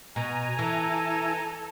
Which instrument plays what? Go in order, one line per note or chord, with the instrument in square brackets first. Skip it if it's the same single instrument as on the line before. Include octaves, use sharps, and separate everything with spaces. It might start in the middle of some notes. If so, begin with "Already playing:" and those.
[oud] B2 [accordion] G#5 A#5
[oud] E3 [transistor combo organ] E4 [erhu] A4